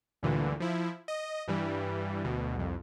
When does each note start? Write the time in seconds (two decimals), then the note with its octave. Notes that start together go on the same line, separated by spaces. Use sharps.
0.23 D2 G2 A#2 D3 E3
0.60 F3 E4
1.08 D#5
1.48 G2 E3 G3
2.24 D2 B2
2.56 C2 F2